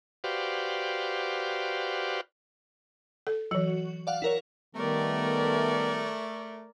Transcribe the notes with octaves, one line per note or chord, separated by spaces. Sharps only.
F#4 G4 B4 C5 D5 F5
A4
E3 F#3 F#4
D5 F5 F#5
E4 A#4 C#5
D#3 G3 A3 B3 A#4 D5